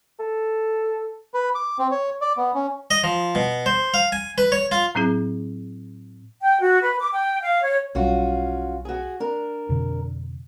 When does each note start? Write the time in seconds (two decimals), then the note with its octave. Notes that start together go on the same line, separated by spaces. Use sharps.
0.20 A4
1.34 B4
1.55 D6
1.79 C4
1.91 C#5
2.21 D5
2.37 B3
2.54 C#4
2.91 D#5
3.04 F3
3.35 B2
3.66 C5
3.94 F5
4.12 G#5
4.38 B4
4.52 C#5
4.72 F4
4.95 A2 F#3 C4 E4 G#4
6.41 G5
6.60 F#4
6.81 B4
6.99 D6
7.12 G5
7.42 F5
7.62 C#5
7.95 B1 G3 C#4 F4 F#4
8.85 F#4 G#4
9.20 D4 A#4
9.69 F2 B2 D3